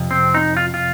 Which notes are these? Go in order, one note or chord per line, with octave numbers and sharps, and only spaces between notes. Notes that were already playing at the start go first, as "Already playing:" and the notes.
Already playing: F2 C3
C4
D#4
F4
F4